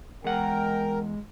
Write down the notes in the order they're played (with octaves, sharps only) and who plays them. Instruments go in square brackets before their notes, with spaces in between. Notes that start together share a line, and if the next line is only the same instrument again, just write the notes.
[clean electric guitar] E2 F#5 [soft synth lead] G#3 [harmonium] A#4 [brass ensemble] G5